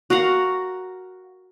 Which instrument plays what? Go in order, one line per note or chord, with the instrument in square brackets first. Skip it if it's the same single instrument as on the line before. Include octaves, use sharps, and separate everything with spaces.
[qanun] F#4 A#4 F5 F#5